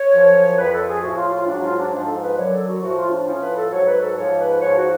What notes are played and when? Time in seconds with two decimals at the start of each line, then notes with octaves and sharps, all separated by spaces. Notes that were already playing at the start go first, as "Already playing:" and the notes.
Already playing: C#5
0.14 F#2 F3
0.58 F2 F3 B4
0.73 A4
0.89 G#4
1.03 A2 F3 F#4
1.18 F4
1.33 F4
1.47 G#2 F#3 D4
1.63 F4
1.78 D4
1.92 G#2 F3 D4
2.07 A4
2.23 B4
2.37 F#2 D3 F#3 C#5
2.52 A4
2.67 F#4
2.82 A2 F3 F#4
2.97 F4
3.11 D4
3.26 A2 F3 C#4
3.42 B4
3.57 A4
3.72 G#2 F#3 C#5
3.86 B4
4.01 A4
4.16 G#2 F3 C#5
4.39 B4
4.61 G#2 F3 C#5
4.76 F#4